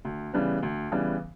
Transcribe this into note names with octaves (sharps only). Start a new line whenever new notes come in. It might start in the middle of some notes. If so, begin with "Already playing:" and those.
D2
C#3 E3 G3 B3
D2
C#3 E3 G3 B3